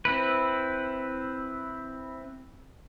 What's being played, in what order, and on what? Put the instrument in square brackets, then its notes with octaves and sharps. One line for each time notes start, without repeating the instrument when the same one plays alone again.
[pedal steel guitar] C4 E4 B4